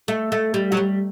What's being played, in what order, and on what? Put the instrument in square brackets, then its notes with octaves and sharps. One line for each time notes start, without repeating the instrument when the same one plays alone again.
[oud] A3
A3
G3
F#3
G3